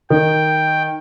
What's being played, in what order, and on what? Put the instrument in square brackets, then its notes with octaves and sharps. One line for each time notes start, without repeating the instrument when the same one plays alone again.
[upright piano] D#3 [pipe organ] G5